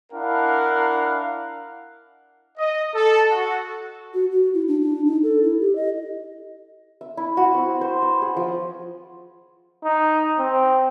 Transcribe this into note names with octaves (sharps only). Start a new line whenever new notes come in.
D4 E4 A#4 F5 F#5
D#5
A4
F#4
F#4
F#4
E4
D4
D4
D#4
A4
E4
G4
D#5
E5
E4
F#4
C4
C5
B5
G#4
F3
D#4
C4